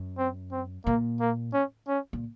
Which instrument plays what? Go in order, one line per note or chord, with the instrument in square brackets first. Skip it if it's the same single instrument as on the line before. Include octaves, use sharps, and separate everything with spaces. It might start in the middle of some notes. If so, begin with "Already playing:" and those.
Already playing: [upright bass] F#2
[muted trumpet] C4
C4
[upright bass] A#2 [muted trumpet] A#3
[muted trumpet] A#3
C#4
C#4
[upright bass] A#2